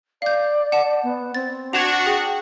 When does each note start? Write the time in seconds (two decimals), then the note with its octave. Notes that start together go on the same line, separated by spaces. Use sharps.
0.22 D5 F5 G6
0.72 F#5 A5
1.03 B3
1.35 C4 A6
1.73 D4 F#4 G#6 E7 F7
2.06 G#4 G5